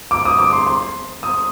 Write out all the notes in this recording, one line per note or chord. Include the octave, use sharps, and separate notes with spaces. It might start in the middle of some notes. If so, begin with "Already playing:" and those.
D6
D#6
D6
C6
C6
D#6